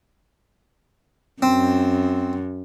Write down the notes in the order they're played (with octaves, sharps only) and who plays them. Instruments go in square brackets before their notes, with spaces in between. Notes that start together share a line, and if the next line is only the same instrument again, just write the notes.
[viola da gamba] F#2 [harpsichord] C4